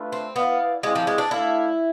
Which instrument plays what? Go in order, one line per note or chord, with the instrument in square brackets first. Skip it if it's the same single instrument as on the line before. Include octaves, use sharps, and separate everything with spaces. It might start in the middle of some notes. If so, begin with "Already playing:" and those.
Already playing: [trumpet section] A3 D4 F4 B4 E5
[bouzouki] C4
[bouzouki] B3 [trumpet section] E4 B4 D5 F5
[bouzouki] G#3 [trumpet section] C4 E4 G#4 D5 F5
[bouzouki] F3
G#3
D4
[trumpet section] A3 D4 A4 D5 F5 [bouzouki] E4